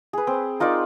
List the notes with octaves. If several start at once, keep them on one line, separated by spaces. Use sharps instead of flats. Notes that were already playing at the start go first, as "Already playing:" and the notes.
G#4 B4
C4
D#4 F4 A#4 D5